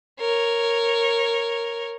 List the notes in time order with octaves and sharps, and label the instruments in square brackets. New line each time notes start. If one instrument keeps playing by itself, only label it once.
[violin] A#4 C#5